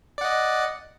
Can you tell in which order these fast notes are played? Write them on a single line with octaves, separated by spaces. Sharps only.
D5 F#5 D#5